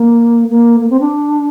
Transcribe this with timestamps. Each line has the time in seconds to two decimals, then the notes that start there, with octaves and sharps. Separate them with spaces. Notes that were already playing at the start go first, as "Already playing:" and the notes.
Already playing: A#3
0.50 A#3
0.80 A#3
0.90 C4
1.00 D4